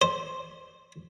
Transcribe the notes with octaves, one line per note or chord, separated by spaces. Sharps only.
C5